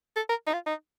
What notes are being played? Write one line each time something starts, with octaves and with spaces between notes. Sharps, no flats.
A4
A#4
D#4
F4
D#4